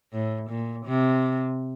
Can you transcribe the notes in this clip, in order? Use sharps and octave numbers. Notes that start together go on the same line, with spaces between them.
A2
A#2
C3